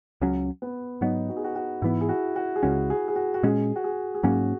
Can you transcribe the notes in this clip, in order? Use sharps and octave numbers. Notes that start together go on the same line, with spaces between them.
C#2 C#3 F#3 C#4
B3
G#2 F#3 B3 D#4
F#4
G#4
F#4
F#4
G#2 E3 B3 E4
G#4
F#4
F#4
G#4
C#2 C#3 G#3 C#4 F#4
G#4
G#4
F#4
F#4
A#2 G#3 C#4 G#4
F#4
G#4
G#4
G#2 F#3 A#3 C#4 F#4